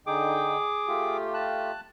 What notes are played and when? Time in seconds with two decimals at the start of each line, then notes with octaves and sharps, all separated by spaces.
0.07 D3 D#4 G#4 G5 D6
0.88 A3 F4 G4
1.34 A5 F#6